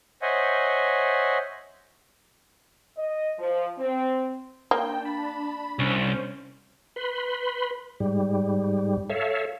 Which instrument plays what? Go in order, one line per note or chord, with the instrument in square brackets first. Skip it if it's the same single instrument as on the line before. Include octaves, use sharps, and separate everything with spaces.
[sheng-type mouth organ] C5 C#5 D#5 E5 F#5 G#5
[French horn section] D#5
F3
C4
[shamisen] A#3 [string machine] D4 A5 [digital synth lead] G5
[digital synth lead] B5
[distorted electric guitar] C2 [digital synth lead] C#4 [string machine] C5 C#6 G6
[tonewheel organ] B4 B5 C6
G#2 G3
A4 C#5 E5 F5